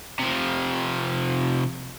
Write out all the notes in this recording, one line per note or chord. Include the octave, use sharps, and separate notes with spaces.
C3 F3